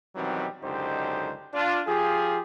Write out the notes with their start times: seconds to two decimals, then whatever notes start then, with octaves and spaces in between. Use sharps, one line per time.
0.16 B2 D#3 E3 F#3 G3 C4
0.62 C#2 F#2 D3 D#4 G4 C5
1.54 D4 F4
1.87 F3 F4 G4 G#4